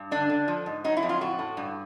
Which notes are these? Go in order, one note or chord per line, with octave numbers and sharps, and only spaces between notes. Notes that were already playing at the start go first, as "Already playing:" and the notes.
Already playing: G2
D3 D4
D3
F3
G#2
F#3 D#4
E4
F2
F4
A2 F#4
A2
G2